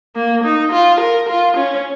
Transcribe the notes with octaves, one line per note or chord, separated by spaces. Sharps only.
A#3
D#4
F4
A#4
F4
C#4